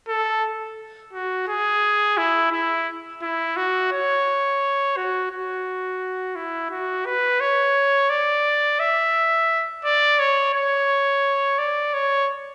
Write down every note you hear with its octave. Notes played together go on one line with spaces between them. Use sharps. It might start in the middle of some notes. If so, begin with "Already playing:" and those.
A4
F#4
G#4
E4
E4
E4
F#4
C#5
F#4
F#4
E4
F#4
B4
C#5
D5
E5
D5
C#5
C#5
D5
C#5